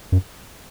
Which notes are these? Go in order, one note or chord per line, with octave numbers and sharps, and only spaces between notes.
F#2